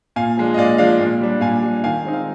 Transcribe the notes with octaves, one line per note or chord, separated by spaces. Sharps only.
A#2 F5 G#5
F3 G#3 D4
D#5
A#2 D5 F5
F3 G#3 D4 D5 F5
A#2
G3 D4
A#2 F5 G#5
G3 D4
D#3 F5 G#5
G#3 C4 D#4
F5